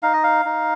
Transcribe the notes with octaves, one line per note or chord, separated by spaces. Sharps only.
D#4 F5
D#5
F5
D#4